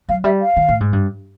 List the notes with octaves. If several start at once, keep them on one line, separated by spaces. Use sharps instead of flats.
F#3 F5
G3 E5
F5
D#3
A2
G#2
G2